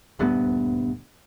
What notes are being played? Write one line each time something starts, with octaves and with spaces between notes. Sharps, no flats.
D#1 D2 G2 B3